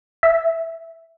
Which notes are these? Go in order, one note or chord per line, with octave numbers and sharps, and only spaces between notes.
E5